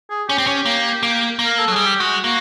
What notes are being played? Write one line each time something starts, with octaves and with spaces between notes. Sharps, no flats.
G#4
C#4 G4
C4
C#4
A#3
A#3
A#3
A#4
A4
F#3
G3 G#4
G4
G#3 F#4
A#3 F#4